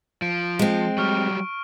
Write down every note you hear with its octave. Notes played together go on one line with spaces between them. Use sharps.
F3 D7
G#3 C4
F#3 G3 C#6 F6